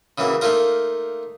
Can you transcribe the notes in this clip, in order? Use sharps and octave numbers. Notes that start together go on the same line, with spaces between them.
C#3 E3 F#3 A#3
A3 A#3 D#4 F4 A#4